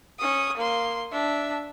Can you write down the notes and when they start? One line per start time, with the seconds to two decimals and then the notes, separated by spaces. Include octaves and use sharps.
0.19 C#4 D#6
0.57 A#3 C6
1.12 D4 E5